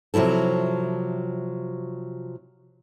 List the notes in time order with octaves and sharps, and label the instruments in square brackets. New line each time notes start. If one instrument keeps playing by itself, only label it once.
[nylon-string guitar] C3 F3 F#3 E4 A4